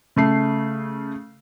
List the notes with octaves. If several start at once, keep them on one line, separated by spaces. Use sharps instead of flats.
C#3 A3 C7